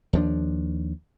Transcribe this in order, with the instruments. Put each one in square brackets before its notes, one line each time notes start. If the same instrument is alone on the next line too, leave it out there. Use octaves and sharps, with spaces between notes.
[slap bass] D#2 F3 D4